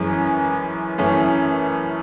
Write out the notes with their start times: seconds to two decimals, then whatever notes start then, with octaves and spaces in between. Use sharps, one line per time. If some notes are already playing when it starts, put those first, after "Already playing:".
Already playing: F#2 E3 G#3 C#4
0.98 F#2 E3 A3 C#4